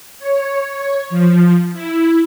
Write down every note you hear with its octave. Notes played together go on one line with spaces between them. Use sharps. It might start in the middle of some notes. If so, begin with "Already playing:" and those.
C#5
F3
E4